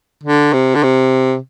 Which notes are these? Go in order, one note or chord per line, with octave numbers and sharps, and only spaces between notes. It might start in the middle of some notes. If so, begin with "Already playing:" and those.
D3
C3
D3
C3